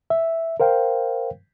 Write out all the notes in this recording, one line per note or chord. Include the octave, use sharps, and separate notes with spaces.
E5
A#4 C5 F5 G5